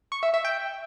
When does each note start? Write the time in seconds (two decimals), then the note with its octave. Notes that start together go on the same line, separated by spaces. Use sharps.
0.12 C#6
0.23 E5
0.34 E5
0.45 G5